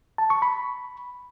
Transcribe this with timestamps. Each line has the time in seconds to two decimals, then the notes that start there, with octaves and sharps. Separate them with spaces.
0.18 A5
0.30 C#6
0.42 B5